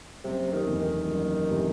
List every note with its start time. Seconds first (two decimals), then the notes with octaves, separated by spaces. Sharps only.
0.24 F#1 C3
0.52 D#3
0.65 E2 C3 E3 A3
0.80 D#3
1.07 F#1
1.48 C3 E3 A3